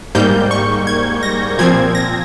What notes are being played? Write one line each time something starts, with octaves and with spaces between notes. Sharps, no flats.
G#2 G3 A#3 G6
C#6
G#6
A#6
A#2 F3 C4 G#6
A#6